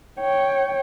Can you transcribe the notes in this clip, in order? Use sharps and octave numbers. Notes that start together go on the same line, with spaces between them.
C#5 G5